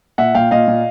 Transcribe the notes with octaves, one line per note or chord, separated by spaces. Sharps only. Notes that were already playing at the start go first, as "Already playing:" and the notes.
A#2 E5 F#5
A#2 F5 G5
A#2 D#5 F5
A#2